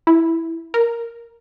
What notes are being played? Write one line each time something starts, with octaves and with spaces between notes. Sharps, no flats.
E4
A#4